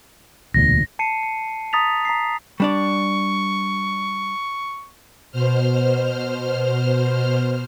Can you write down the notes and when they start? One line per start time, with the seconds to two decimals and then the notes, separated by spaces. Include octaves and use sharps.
0.54 E1 D2 A#2 A#6
0.99 A5 C7 C#7 D#7
1.23 C#7
1.73 A5 A#5 D#6 A6 B6 F7
2.05 A#5 B6 C7
2.60 G3 D4 D5 C#6
5.32 B2 C5 F6